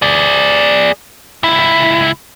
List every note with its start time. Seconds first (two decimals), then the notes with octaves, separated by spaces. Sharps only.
0.02 G#4 D5
1.43 C#2 E4